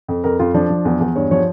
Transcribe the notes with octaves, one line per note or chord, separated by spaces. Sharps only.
F2
F2 A#4
F2 F4
F3 D4
F3
E2
E2
G2 C#5
F3 C#5